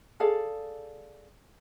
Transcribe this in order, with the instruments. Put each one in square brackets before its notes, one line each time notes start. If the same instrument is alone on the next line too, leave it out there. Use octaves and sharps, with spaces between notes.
[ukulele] G#4 A4 D5 F5